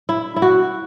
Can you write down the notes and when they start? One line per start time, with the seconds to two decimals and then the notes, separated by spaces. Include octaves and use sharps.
0.09 E4
0.36 E4
0.42 F#4